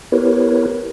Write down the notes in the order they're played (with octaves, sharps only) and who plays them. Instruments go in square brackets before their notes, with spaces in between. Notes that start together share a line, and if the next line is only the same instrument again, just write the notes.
[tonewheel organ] B3 E4 G4 A#4 B4 C#5